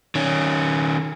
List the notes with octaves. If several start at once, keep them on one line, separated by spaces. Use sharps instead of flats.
D#3 C#4